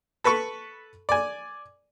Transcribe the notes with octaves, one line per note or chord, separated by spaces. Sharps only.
A4 B4 B5 C#6
D5 G#5